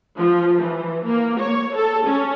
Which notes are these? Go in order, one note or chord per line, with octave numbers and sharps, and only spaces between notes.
F3
E3
A#3
C#5
A4
C#4